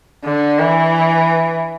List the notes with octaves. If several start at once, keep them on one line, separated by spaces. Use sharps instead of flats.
D3
E3